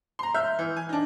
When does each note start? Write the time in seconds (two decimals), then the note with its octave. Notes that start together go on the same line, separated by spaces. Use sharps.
0.19 A#5 C6
0.34 E5 F6 G6
0.59 E3
0.77 G#5
0.89 D4 D#4